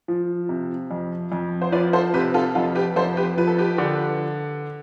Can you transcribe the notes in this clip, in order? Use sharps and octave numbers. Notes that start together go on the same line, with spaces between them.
F3
C3
F2
F2
C5
F3 B4 D5
A4 C5
C3 G4 B4
F4 A4
F2 F4 A4
G4 B4
F2 A4 C5
G4 B4
F3 B4
A4
G4 B4
D3